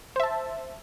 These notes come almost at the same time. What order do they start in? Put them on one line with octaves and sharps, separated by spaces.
C5 E5 A5